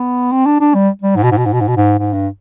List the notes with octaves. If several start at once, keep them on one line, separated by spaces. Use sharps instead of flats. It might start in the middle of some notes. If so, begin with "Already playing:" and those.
Already playing: B3
C4
D4
D4
G3
G3
G#2
B2
G#2
B2
G#2
B2
G#2
B2
G#2
G#2
G2